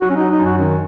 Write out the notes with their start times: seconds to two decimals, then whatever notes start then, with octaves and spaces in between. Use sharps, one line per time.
0.02 F#3 F#4
0.10 C#4
0.16 F#3 D#4
0.31 D#4
0.39 F#2
0.45 F#4
0.58 D#3 C#4